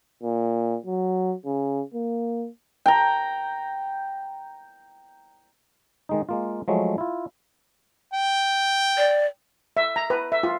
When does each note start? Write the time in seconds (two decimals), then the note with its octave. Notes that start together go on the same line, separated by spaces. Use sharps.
0.23 A#2
0.86 F#3
1.46 C#3
1.94 A#3
2.86 G5 A#5
6.09 D#3 G#3 D#4
6.29 G#3 A#3 F4
6.68 F3 F#3 G#3 A3
6.98 E4 F4
8.13 G5
8.97 D5
9.77 E5
9.96 A#5
10.10 B4
10.32 E5
10.43 F4